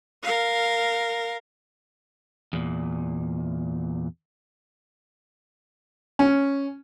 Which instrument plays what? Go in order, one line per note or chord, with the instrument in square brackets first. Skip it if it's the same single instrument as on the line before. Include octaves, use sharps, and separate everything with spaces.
[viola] A#4 F5
[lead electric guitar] E2 A#2
[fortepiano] C#4